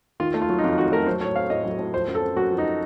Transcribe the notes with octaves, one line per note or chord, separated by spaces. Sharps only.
D#3 F4
A3
F4
F#3
D#4
F2 F4
D#3 F#4
A3 A#4
F#3 C5
A2 C#5
C4 F5
A2 D#5
F#3
A2
F3 C5
F#2
A4
C4
F#2 F#4
F3
D#4